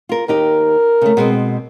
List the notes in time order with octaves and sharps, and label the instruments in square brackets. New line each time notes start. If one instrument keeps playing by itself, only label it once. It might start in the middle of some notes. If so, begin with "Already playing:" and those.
[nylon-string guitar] F4 A#4
[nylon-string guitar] D#2 D#4 G4 [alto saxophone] A#4
[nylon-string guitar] C#3 A3
B2 G#3 C4